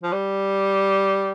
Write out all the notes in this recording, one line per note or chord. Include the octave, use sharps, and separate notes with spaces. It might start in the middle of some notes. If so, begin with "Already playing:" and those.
F3
G3